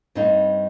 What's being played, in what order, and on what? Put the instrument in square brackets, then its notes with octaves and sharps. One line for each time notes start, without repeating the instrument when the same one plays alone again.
[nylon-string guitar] G2 G3 C4 D#4